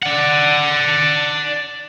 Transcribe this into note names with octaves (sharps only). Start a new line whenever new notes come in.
D5 F#5